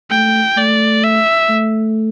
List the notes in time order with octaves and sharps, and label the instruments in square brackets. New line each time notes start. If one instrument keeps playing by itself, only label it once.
[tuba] A3 [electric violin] G5
[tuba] A3 [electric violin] D5
[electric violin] E5
[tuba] A3